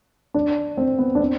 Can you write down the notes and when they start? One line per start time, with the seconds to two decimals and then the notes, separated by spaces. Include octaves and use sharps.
0.34 D4
0.77 C4
0.98 B3
1.15 D4
1.19 C4